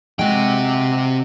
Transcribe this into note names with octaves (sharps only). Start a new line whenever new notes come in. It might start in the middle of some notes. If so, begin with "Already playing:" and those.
C3 G#3 F#4 G5